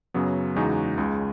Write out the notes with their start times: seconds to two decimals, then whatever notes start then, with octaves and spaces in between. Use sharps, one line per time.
0.14 F#2 C#3 F#3 B3
0.56 E2 C#3 G#3 D#4 F#4
0.98 C#2 C#3 G#3